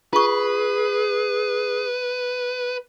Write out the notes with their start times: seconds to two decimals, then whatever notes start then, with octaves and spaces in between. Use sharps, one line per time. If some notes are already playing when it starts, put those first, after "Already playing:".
0.13 F4 G#4 B4 C#6